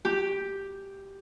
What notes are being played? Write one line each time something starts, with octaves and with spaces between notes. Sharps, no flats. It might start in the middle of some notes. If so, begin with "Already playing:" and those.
G4